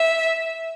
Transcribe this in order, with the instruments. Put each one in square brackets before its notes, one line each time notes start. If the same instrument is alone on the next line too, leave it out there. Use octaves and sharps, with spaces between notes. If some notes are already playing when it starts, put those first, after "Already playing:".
Already playing: [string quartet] E5